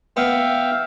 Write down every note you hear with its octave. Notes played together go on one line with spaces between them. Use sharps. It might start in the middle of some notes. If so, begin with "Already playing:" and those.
B3 E5 F5 G5